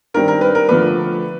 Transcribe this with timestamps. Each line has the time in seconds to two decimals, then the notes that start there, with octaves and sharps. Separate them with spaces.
0.14 G2 D#3 G3 C4 A#4
0.28 A#4
0.41 B4
0.55 A#4
0.69 D3 F3 A3 D4 B4